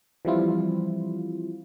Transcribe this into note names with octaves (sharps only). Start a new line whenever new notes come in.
E3 F3 G3 C4 E4 F4